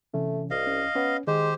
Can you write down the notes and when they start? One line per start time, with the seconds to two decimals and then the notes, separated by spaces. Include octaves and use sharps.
0.14 C3 E3 A3 C#4
0.51 C2 D#5 F5
0.67 C#4
0.95 B3 C#4
1.27 D#3 G#3 G4 C5